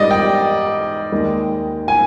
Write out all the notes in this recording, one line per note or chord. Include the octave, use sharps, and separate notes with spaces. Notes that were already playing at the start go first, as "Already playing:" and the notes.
Already playing: G#2 G3 D5 D#5
G5
D#2 D#3 G#3
G#5